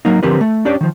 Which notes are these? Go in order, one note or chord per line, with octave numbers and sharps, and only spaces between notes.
F#3 A#3 D#4
D3 F3 C4 G4 A#4 B4
A3
C#4 D4 G4 D5
D#3 F3